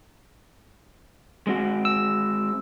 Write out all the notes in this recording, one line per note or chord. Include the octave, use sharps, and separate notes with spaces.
G#3 C4 F#4
E6